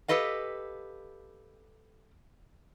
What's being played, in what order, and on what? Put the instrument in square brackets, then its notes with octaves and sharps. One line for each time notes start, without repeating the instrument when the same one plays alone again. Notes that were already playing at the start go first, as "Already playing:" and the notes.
[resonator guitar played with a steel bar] G4 A4 B4 D#5 F5